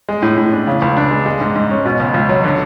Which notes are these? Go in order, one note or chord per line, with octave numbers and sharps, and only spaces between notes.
G#3
A2
A2
D4
C#3
C#2
D4
G#3
G#3
G#2
G#2
C#4
B2
C#2
C#2
F#3
D3